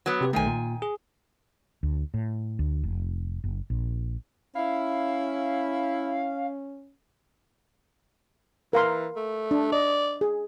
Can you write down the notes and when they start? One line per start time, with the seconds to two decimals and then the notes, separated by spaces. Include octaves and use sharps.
0.06 F#3 B3
0.21 C3 G4 B4
0.33 B1 D#3 A3 G5 G#5
0.46 A#2
0.82 G#4
1.83 D2
2.14 A2
2.59 D2
2.83 F1
3.44 F#1
3.70 A#1
4.55 C#4 E4 F5
8.73 E3 A#4 F5 C6
9.16 A3
9.51 D4
9.72 D5 D#5
10.21 G#4